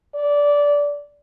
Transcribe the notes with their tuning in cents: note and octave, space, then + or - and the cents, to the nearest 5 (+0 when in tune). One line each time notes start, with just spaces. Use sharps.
D5 -15